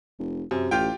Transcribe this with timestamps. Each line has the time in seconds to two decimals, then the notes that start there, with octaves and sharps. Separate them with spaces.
0.19 F1
0.51 F#2 C3
0.71 A1 F4 G4 G5